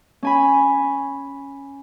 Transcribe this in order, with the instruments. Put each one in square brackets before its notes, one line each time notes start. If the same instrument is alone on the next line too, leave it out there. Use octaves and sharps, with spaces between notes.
[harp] C#4 G#5 B5